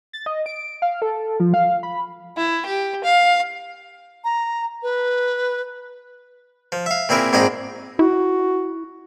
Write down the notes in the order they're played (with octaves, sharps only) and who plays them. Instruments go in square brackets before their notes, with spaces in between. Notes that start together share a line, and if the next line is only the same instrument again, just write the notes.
[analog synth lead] A6
D#5
D7
F5
A4
F3
F5
B5
[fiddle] E4
G4
F5
[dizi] A#5
B4
[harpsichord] F3
E5 F5
A#2 C4 E4 G#4 A#4
A#1 G#2 C4 D4 D#5
[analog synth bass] E4 [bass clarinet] F#4